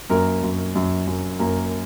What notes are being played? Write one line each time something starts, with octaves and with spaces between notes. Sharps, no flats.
F#2 A#3 A#4
F#2
F#2
F#2
F#2 A#3 A#4